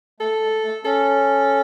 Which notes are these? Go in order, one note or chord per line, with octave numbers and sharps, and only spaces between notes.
A3 A4
G#3
A3
C#4 A4